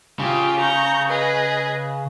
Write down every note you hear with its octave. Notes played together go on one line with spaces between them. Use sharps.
C#3 F4 G4
A#5 C#6 G6
G#4 B4 D#5